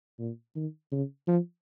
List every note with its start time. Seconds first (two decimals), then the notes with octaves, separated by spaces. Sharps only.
0.19 A#2
0.56 D#3
0.92 C#3
1.27 F3